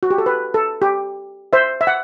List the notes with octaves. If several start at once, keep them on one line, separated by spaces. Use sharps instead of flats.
F#4
G4
A4
B4
A4
G4
C5 E5
E5
F#5